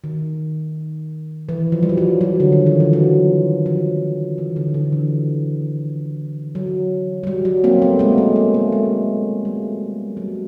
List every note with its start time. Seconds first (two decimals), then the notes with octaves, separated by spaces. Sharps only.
0.04 D#3
1.49 E3
1.72 F3
1.83 G3
1.89 F#3
1.98 F3
2.21 F#3
2.40 D3
2.53 D#3
2.66 E3
2.80 F3
2.93 F#3
3.66 F3
4.38 E3
4.56 D3
4.74 D3
4.92 E3
6.55 F#3
7.23 F#3
7.27 G3
7.45 F#3
7.64 A#3 C4
7.82 A3 B3
7.99 G#3 A#3
8.18 A3
8.36 A3
8.54 A3
8.72 G#3
9.45 G3
10.17 F#3